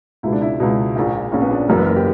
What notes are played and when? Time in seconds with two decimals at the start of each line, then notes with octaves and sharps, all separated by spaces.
0.23 C#2 B2 E4
0.32 D4
0.42 E4
0.60 C#2 B2
0.96 A#1 A#2
1.32 A#1 A#2 C#4
1.41 B3
1.51 D4
1.68 F#1 F#2 E3 A#4
1.78 B4
1.86 A#4
1.96 G4